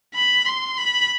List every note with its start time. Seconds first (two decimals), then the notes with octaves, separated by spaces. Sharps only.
0.14 B5
0.46 C6
0.78 B5